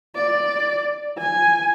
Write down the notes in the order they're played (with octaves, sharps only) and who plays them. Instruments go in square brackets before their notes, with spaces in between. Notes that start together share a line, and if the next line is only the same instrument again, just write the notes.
[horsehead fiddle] D5
G#5